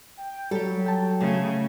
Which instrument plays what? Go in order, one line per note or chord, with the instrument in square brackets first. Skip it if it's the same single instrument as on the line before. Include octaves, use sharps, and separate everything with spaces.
[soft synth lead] G5
[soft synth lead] F#3 [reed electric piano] G3 [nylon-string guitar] G4 A4
[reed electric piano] G5 A5
[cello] C#3 [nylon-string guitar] A3